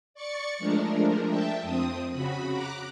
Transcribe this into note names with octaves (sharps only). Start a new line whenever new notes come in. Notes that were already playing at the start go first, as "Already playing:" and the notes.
D5 C#6 A6 C#7
F3 G#3 A3 D4 A#4
E5 G5 A5
F2 C4 D#6
C#3 F#4 B5
A#5 D6 F#6